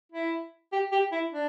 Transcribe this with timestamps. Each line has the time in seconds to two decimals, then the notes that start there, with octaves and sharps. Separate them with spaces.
0.12 E4
0.72 G4
0.92 G4
1.12 E4
1.32 D4